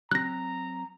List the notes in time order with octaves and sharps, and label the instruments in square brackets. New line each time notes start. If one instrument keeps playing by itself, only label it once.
[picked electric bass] F#3 C4 [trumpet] A#5 [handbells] F#6 A#6